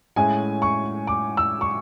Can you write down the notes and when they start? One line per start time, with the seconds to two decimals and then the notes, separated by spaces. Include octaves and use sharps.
0.16 A2 G#3 C#4 E4 G#5
0.62 C#6
1.07 D6
1.37 E6
1.61 C#6